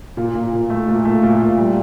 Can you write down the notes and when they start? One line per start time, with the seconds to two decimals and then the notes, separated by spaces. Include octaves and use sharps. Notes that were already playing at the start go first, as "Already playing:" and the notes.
0.17 A#2
0.35 A#2
0.53 A#2
0.70 A3
0.88 A#2
1.05 A3
1.23 A#2
1.41 A#2
1.59 G3